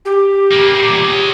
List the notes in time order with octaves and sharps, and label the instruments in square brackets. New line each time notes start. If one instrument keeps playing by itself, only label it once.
[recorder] G4
[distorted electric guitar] C#3 A#3
E2 A#2
G#3 C#5